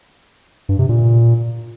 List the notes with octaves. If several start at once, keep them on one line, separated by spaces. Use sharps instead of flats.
G2
C3
A#2